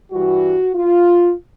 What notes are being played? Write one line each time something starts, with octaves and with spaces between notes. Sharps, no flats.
G2 E3 G3 F#4
F4